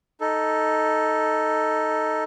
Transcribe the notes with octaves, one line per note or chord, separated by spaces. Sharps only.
D#4 A4